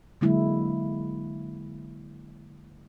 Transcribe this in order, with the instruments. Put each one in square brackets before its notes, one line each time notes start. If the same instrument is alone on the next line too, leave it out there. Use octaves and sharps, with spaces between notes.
[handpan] D3 F#3 G#3 A#3 E4